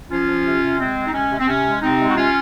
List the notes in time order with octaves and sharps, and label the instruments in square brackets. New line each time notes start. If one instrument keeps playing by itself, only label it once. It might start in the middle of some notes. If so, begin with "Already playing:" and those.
[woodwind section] F3 C#4 F4
F3
C3
C3
G#3 C4
C3
D#4
G#3 C#4
C3
C4
C3 C#4
G#3
C3 C4 D#4
G#3
F#4
C3 C#4 F4